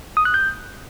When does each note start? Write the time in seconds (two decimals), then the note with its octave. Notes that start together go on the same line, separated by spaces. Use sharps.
0.17 D#6
0.25 F#6
0.34 G6